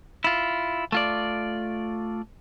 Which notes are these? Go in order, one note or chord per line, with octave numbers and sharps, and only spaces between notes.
E4 F4
A3 F4 D5